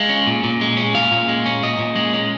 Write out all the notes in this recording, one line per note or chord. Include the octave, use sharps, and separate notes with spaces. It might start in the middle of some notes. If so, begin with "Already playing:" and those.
Already playing: G#3 F5
C#4
A#2
A#2
G#3
C#4
A#2 F5
A#2
G#3
C#4
A#2 D#5
A#2
G#3
C#4